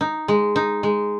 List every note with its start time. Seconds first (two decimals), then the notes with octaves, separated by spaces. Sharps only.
0.01 D#4
0.28 G#3
0.56 D#4
0.83 G#3